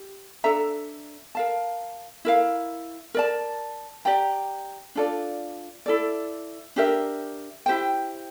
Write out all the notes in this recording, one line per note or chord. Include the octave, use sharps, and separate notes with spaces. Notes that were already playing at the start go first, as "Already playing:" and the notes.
Already playing: G4
D4 A4 E5 A#5
A#4 F5 A5
E4 A#4 F5
A#4 D5 A5
G4 D5 G5 A#5
D4 F4 A4 D5
E4 A4 D5
D4 G4 A#4 E5
E4 G4 C5 G5